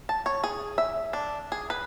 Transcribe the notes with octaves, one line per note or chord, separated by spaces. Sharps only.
A5
C#5
G#4
E5
D4
G#4
B4